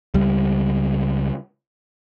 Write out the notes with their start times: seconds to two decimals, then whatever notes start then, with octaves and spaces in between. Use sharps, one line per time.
0.14 C#2 G3